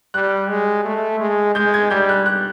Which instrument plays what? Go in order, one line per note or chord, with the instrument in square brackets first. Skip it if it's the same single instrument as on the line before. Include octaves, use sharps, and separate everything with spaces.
[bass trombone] G3 [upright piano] F#6
[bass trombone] G#3
A3
G#3
[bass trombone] G#3 [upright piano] G6
[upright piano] G#6
[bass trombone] G3 [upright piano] G6
[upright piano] F#6
F#6